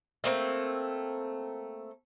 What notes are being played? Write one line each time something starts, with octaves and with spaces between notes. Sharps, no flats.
A3 A#3 C4